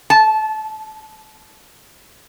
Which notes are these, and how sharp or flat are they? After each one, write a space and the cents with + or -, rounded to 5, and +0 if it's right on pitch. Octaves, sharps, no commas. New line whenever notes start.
A5 -25